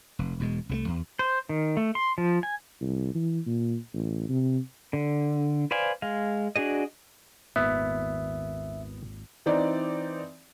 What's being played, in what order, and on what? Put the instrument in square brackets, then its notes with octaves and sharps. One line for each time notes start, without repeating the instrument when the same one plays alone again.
[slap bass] F1
E1 B2 G#3
C2 E3 A3
E2
[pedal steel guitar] C5
D#3
A3
C6
F3
G#5
[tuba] C2
E3
A#2
A1
C3
[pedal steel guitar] D3
B4 C5 D5 F5 G#5
G#3 F5
D4 F#4 G#4 D#5
[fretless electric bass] G#1 D#2 A#2 [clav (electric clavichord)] B3 [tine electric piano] E5
[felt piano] E3 C4 D#4 D5